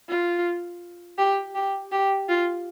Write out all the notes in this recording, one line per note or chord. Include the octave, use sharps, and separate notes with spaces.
F4
G4
G4
G4
F4